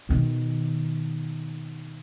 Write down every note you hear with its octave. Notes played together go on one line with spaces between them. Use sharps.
B2 D#3